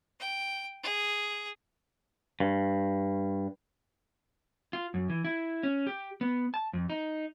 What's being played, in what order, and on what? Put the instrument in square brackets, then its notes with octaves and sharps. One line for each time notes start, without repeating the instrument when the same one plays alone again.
[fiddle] G5
G#4
[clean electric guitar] G2
[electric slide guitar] F4
F#2
E3
E4
C#4
G4
B3
A5
F2
D#4